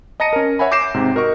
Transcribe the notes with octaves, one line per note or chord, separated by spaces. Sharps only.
D#5 A5 A#5 A#6 C#7 D#7
C#4 A#4
C#5 E5 F#5 G#5 B5
D6 G6 A#6 C7 D7 E7
G#2 C3
F#4 A#4 D#5 C#6